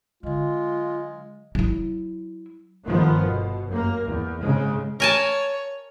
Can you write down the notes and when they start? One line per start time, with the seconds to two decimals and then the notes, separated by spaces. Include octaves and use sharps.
0.23 D3 F#3 G#3 F4
1.55 F#3 E4
2.85 G1 D#3 F3 B3
3.26 B2
3.69 F#2 A#3
4.04 E2
4.42 G#2 C#3 G#3
5.00 A#4 C#5 G#5 A5